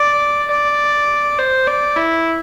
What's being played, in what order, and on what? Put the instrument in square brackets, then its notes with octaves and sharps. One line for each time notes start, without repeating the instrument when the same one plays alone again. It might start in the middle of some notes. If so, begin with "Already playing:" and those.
Already playing: [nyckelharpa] D5
D5
C5
D5
E4